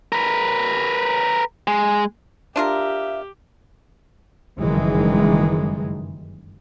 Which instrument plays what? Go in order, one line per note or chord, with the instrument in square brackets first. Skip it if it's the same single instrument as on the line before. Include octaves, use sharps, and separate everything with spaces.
[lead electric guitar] A#4 B4
G#3
[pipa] D4 F4 A#4 [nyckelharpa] G4 [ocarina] E5
[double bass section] F#1 G2 D#3 E3 G#3